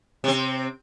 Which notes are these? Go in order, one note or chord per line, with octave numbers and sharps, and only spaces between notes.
C3 C4